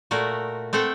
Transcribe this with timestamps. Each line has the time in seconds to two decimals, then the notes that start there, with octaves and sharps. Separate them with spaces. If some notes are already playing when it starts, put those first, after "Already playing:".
0.11 A#2 A3 F#4 A#4
0.73 A3 C4 A4 F#5 G5